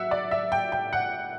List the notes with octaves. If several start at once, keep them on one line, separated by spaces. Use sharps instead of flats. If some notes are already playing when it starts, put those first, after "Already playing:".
Already playing: F#3 E5 F#5
D5
E5
G5
G5
F#5